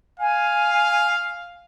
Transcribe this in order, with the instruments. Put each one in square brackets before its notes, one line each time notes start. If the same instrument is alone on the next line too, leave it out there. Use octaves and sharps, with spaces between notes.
[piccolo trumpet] F5 [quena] G#5